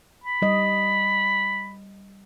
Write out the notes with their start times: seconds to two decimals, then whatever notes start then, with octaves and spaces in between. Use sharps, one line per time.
0.24 B5
0.42 G3 D#5